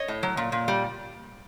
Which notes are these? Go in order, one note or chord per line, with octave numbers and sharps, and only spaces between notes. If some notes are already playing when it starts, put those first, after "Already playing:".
Already playing: C#5 D#5
A2
F#3
A#2
A#2
G3